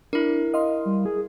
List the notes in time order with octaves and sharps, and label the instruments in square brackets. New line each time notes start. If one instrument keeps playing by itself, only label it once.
[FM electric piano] D4 [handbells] E4 A#4
[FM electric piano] D#5 F5 C6
[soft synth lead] G3
G#4